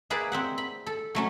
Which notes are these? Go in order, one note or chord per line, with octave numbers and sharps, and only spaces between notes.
A#3 E4 G#4 B4 D5 F5
C4 E5 F#5
B5
A4
F#3 A3 C#4